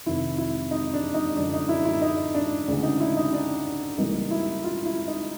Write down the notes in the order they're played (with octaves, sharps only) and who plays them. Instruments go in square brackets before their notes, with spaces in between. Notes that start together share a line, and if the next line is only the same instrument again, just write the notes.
[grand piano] F2 C3 D#3 E4
E4
D#4
D4
D#4
F#2 D3 F3 D4
D#4
E4
E4
D#4
D4
D2 C#3 E3 G#3 D4
D#4
E4
D#4
D4
C#2 C#3 E3 G3 A#3 D#4
E4
F4
E4
D#4